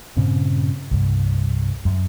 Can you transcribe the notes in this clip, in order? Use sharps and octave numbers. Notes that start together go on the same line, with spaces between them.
G2 A#2 C#3 C4
C2 G2
F#2